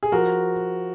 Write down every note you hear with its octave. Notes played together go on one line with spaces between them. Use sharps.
G#4
F3 F#4 A#4